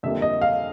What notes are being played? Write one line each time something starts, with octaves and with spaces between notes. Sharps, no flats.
F2 D3 G3 A#3 E5
D#5
F5